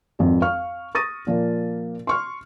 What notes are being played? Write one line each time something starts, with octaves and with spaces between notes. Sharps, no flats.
G#1 F2
F5 C#6 F6
C#6 D#6 A6 A#6 D#7
A#2 F3 A#3
C6 C#6 F6